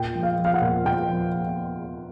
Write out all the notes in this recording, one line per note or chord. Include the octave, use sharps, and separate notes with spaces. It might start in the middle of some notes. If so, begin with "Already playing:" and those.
Already playing: A#2 G5
F3
F5
F3
F5
F#5
A#2
A#2 G5
F3